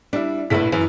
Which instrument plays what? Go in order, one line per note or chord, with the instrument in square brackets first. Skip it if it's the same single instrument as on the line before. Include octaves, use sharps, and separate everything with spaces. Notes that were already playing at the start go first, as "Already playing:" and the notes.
[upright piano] G3 E4 [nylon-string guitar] D4
[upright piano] A#1 A2 B6 [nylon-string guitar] E4 A#4 B4
[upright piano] F#2 [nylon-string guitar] E3